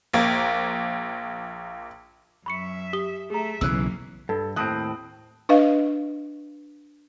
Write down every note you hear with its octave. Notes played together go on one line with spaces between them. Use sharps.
A#1 A#3
F#2 E5 B5 C#6 C#7
G4 D#6 G7
A3 G#4 E5 A#5
B1 F#2 C#3 E3 A#3 E6 F#6
G2 A4
D#2 A2 C4 D#6 F#6
D4 B4 D#5 F5